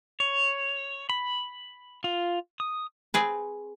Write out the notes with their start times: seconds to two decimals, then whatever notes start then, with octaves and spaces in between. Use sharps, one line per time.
0.20 C#5
1.10 B5
2.04 F4
2.60 D#6
3.14 C4 G#4 B4